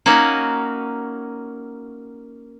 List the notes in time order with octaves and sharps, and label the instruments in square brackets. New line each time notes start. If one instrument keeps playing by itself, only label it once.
[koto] A#3 C#4 D#4 F#4